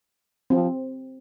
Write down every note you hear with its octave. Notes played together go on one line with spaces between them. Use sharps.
F3 C4